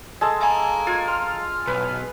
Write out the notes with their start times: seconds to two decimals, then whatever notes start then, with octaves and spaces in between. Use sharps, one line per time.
0.21 G#3 A4 A5
0.42 F5 G#5 A#5
0.87 F4 G#6
1.08 C6 F6
1.67 B1 B4